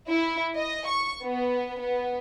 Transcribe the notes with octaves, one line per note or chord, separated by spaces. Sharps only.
E4
D#5
C#6
B3
B3